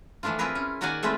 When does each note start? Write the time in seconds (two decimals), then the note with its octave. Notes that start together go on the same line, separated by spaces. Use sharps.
0.23 E3 F3 A3 D4 F4
0.39 C4 E4 F4 G#4 A#4 B4
0.55 C#4
0.81 D#3 A#3 F#4 D5 F#5 G#5
1.03 G#3 A3 C4 F4 B4